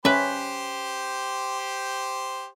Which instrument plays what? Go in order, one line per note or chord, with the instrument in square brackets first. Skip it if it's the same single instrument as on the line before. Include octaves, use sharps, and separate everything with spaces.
[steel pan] C#4 [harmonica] G4 C5 [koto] B4 E5